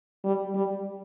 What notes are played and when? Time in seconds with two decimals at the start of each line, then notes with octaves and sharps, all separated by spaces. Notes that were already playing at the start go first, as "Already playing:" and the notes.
0.24 G3
0.55 G3